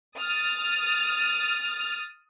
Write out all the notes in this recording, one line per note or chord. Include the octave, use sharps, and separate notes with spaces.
D#6 F6 A6